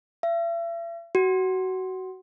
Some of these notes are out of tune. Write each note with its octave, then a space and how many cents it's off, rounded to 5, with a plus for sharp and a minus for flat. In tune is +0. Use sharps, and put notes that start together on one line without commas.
E5 +40
F#4 +20